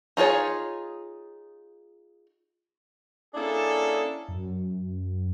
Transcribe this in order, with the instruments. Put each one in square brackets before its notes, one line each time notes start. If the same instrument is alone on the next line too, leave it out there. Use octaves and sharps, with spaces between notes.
[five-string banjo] D#4 F4 G#4 C#5
[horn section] A#3 C#4 D4 E4 G#4 A4
[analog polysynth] F#2